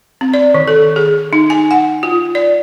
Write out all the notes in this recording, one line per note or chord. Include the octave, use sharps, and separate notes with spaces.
C4
D5
D#3
A4
G#4
D#4
G#5
F#5
F4
D5